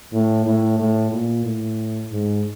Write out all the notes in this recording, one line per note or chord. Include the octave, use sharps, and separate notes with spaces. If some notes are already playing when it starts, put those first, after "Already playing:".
A2
A2
A2
A#2
A2
G#2